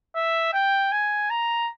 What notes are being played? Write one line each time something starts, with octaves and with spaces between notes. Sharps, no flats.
E5
G5
G#5
A#5